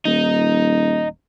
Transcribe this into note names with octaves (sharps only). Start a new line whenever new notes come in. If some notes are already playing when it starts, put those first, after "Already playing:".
D#1 D#4